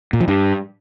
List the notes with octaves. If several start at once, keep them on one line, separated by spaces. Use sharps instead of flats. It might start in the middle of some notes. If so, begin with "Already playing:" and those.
A#2
F3
G2